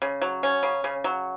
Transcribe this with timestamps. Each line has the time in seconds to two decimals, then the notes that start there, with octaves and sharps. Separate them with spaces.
0.02 C#3
0.22 F#3
0.43 C#4
0.63 C#3
0.84 C#3
1.04 F#3